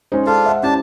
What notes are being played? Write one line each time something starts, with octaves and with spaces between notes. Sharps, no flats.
G#3 C#4 D#4 C5
D4 F4 A4 F5
E5 F#5
C#4 D4 E4 G4 A5